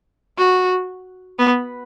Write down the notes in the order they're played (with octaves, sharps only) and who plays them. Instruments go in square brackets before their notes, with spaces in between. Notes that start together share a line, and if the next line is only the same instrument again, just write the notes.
[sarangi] F#4
B3